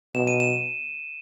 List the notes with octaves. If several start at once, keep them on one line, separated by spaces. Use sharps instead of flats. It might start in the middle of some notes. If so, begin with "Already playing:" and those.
B2 E7
D#7
E7